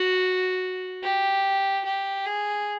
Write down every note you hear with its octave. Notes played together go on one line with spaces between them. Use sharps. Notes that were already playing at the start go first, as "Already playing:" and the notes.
Already playing: F#4
G4
G4
G#4